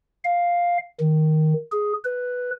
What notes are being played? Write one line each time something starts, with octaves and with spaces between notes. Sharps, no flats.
F5
D#3
G#4
B4